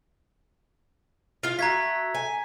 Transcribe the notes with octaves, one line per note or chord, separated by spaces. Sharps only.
F4 F5
A3 F#4 A#5 G#6 B6
G#5